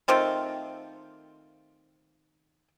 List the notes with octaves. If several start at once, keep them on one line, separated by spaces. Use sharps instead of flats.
D#3 A3 C4 F4